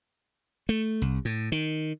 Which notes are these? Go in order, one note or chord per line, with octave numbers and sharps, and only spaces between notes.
A3
C2
A2
D#3